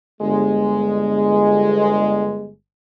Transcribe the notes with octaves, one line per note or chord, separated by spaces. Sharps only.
G1 G#3